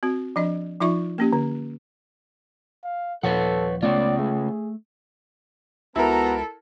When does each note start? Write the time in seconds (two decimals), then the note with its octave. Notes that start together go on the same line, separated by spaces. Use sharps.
0.03 C4 F#4
0.36 F3 D4 D#5
0.81 F3 D#4 F4 E5 C#6
1.18 A#3 C#4 G4
1.33 D3
2.84 F5
3.23 D#1 A#2 F3 A4 B4 C#5 F#5
3.83 C#2 C#3 A3 B3 C#4 F4 D5
4.18 A3 G#4
5.96 C#2 B3 E4 F#4 A4 A#4 A#5